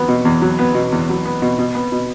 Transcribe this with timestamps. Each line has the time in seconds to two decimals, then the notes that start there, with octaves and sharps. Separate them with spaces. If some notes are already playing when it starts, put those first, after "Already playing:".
Already playing: E2 F#3 B3
0.08 B2
0.25 E2
0.42 F#3
0.59 B3
0.75 B2
0.92 E2
1.09 F#3
1.25 B3
1.42 B2
1.58 B2
1.75 B3
1.92 B2